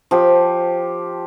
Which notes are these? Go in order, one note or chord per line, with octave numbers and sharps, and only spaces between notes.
F3 G4